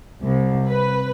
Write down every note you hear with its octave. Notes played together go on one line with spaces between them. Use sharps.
C2
B4